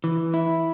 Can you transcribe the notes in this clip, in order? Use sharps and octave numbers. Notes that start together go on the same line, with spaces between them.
E3
E4